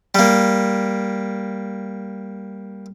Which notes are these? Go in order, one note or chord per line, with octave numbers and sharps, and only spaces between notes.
G3 A#3